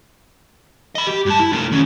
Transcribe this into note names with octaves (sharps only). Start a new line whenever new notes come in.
D#5 B5
G4
G2 A5
E4
A3 F4
D#3 C#4